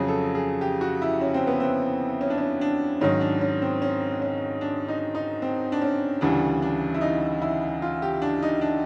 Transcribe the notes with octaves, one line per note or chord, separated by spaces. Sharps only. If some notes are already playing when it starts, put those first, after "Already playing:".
Already playing: F2 C#3 F#3 G#4
A4
G#4
G4
F#4
E4
C#4
C4
B3
C4
C#4
D4
C#4
D4
G#2 D#3 F#3 C#4
D4
C#4
C4
C#4
C#4
D4
D#4
D#4
C4
D4
C#4
D2 C#3 E3 G3 D4
D4
E4
D#4
E4
F4
G4
D4
D#4
D4